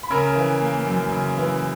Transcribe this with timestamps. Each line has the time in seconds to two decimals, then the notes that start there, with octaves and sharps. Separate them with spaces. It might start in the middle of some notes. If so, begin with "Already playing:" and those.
0.03 B5
0.10 C#3 A#4 A#5
0.36 E3
0.61 A#3
0.87 F#2
1.13 C#3
1.38 E3